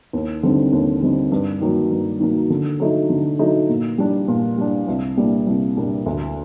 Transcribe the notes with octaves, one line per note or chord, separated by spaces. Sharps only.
D#2
D3 G3 C4 D#4
D#2
D3 G3 C4 D#4
G2
D#3 F#3 A#3
G2
D#3 F#3 A#3
D3
F#3 A3 D#4
D3
F#3 A3 D#4
A#2
G3 D4
A#2
G3 D4
C2
A#2 G3 A#3 D4
C2
A#2 G3 A#3 D4
D2